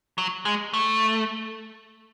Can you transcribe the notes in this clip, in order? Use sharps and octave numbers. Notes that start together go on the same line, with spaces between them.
F#3
G#3
A3